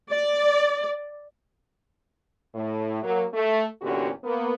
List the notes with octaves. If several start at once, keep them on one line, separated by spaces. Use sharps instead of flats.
D5
A2
F#3 A#3
A3
E2 A#2 D3 C#4 F#4 G4
A#3 B3